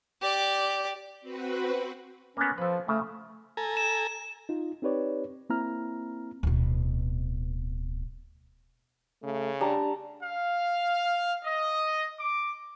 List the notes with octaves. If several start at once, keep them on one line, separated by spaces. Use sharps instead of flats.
G4 D5
C4 F#4 B4
A#3 B3 C#4
F3 A4 B4
C#3 A3
A4 G#5 A#5
E7
D#4 F4
C4 D#4 G4 B4 C#5 D5
A#3 C4 E4 A#5 F6
D1 B2
C#3 A3
G3 D4 A5 A#5
F5
D#5
D6